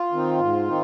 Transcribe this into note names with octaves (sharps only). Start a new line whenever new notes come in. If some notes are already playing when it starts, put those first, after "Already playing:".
Already playing: F4
D#3 C4 D#4
G#2
D#3 C4 D#4